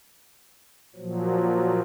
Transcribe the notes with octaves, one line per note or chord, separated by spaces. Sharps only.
A#2 F3 F#3